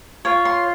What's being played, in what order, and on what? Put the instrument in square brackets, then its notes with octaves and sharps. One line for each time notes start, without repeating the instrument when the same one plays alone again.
[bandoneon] F4 [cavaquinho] C#5
[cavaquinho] C6